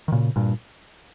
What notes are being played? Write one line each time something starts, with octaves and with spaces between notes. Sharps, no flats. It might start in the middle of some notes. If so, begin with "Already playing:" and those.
D#3
A#2 C#3
G2 A#2